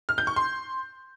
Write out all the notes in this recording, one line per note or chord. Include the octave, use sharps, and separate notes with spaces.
F6
G6
C#6
C6